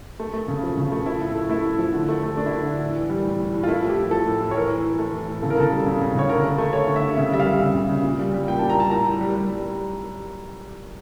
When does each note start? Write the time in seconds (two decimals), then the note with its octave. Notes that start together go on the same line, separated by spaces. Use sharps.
0.20 A3
0.33 A3
0.48 C#3
0.63 F3
0.77 C#3
0.92 A3
1.06 F3 E4
1.21 A2
1.35 A3
1.49 A3 E4
1.65 A2
1.79 F3
1.93 D3
2.09 A3
2.23 A3
2.37 A3 D4
2.46 E4
2.52 D3 D4
2.66 D3
2.80 A2
2.96 E3
3.10 G3
3.25 A2
3.40 A2
3.54 A2
3.63 F4
3.68 A3 E4
3.82 F3
3.89 G4
3.97 A2
4.11 F3 A4
4.26 A2
4.41 A2
4.51 C#5
4.56 E3 A#4
4.70 E3
4.84 E3
4.99 A3
5.13 E3
5.28 A2
5.42 C#3 A4
5.50 A#4
5.57 C#3 A4
5.72 G3
5.86 C#3
6.01 C#3
6.15 C#3 C#5
6.30 D3 A#4
6.44 A3
6.58 A3
6.73 A3 C#5
6.87 D3
6.96 E5
7.02 D3
7.17 C#3 E5
7.32 G3 E5
7.39 F5
7.47 G3
7.60 C#3
7.75 C#3
7.89 C#3
8.04 A#2
8.19 G3
8.34 G3
8.48 A#2 G5
8.59 A#2 A5
8.70 A#5
8.77 G3 A5
8.91 A2 A#5
9.07 A2
9.21 G3
9.36 G3
9.49 G3